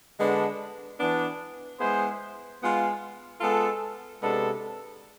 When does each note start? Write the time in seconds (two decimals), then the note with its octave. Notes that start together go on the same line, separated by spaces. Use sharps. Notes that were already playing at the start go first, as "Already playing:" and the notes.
0.18 D3 G#3 B3 D4
0.98 E3 B3 D4
1.79 G#3 B3 E4 G#4 C5
2.60 G#3 B3 F4
3.40 G#3 B3 F4 A4
4.21 C3 G#3 B3 D4 A4